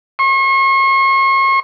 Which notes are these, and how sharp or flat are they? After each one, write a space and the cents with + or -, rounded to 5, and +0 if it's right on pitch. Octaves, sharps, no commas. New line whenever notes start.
C#6 -40